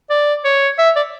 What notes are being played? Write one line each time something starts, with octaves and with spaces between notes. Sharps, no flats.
D5
C#5
E5
D5